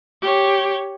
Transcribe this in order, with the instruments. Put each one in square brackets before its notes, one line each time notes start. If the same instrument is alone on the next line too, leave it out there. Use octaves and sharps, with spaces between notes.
[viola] G4 C#5